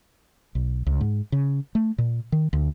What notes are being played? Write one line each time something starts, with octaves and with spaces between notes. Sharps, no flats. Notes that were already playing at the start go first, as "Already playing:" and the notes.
B1
C#2
G#2
C#3
A3
A#2
D#3
D2